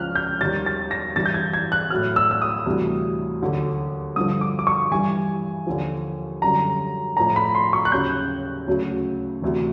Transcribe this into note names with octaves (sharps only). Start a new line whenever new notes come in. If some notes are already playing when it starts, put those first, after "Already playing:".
Already playing: C#2 C#3 F3 F6 F#6
G6
D#2 D#3 G3 A6
A6
A#6
G2 E3 G3 A6
G6
G#6
G#6
F#6
A2 F#3 F6
E6
E6
D#6
D2 C3 E3 G3
D#2 D3 F#3
G2 D3 F3 D#6
D6
D6
C#6
G2 E3 G3 G#5
D#2 D3 F3
F#2 D3 G3 A#5
A2 F3 A#5
B5
C6
C#6
F#6
D#2 C#3 F#3 G6
D2 C#3 F#3
D2 C3 E3